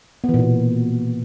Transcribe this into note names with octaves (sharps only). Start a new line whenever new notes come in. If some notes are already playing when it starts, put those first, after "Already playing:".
B3
E3
A#2
B2